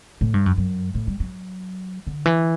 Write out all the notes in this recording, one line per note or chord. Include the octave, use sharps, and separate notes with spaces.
A2
G2
F#2
F#2
A2
G3
F#3
D3
E3